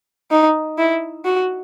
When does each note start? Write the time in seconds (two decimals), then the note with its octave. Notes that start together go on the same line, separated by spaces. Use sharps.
0.31 D#4
0.78 E4
1.25 F#4